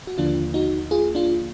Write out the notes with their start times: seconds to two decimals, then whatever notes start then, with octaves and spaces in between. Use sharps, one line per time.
0.07 F#4
0.18 D#2 D3 F3 A#3 D4 F4
0.54 D#4 F#4
0.91 F4 G#4
1.15 D4 F4